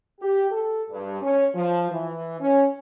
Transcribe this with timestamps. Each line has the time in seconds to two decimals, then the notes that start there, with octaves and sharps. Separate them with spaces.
0.21 G4
0.51 A4
0.90 G2
1.21 C#4
1.55 F3
1.90 E3
2.40 C#4